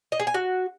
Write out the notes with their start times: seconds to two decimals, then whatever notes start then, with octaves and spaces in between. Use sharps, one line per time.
0.12 D#5
0.20 G#4
0.27 G#5
0.34 F#4